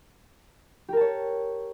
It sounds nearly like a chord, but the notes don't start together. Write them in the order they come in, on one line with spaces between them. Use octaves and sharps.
G4 A#4 A5 C#5